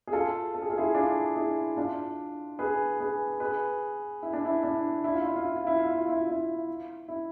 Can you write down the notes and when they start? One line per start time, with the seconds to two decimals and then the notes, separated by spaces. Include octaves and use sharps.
0.07 G#4
0.13 F4 A4
0.54 A4
0.62 G#4
0.70 F4
0.78 E4 G#4
0.95 D4 F4
1.35 E4 G#4
1.77 D4 F4
2.59 G#4 B4
3.00 G#4 B4
3.40 G#4 B4
4.23 E4
4.33 D4
4.45 E4
4.63 D4
5.04 E4
5.14 F4
5.25 E4
5.36 F4
5.45 E4
5.56 F4
5.67 E4
5.78 F4
5.87 E4
5.98 F4
6.09 E4
6.19 F4
6.29 E4
7.08 E4